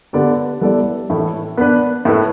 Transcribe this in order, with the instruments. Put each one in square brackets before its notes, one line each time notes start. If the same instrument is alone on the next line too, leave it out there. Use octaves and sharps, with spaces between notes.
[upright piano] D3 B3 G4 D5
G3 B3 E4 A4 D5
A2 E3 A3 E4
B3 D4 B4
A2 A3 E4 B4